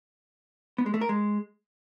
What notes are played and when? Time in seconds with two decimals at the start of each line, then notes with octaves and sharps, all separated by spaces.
0.78 B3
0.86 G#3
0.94 A3
1.01 A#4
1.09 G#3